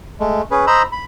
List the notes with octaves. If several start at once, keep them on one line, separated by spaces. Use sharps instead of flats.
G#3 A3
C#4 G#4 B4
C5 D#5 A#5 B5 E6
B5